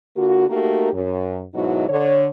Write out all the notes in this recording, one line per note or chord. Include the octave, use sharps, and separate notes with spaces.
D3 A#3 F4 F#4
A3 A#3 D#4 F#4 G4 A#4
F#2
G#2 B2 F#3 D#4 E4 F#4
D3 C#5